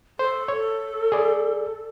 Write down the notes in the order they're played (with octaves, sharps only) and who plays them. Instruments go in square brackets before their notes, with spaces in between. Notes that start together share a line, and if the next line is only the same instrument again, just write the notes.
[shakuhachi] A4 [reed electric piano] C5
[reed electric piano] C#5
G#4 D5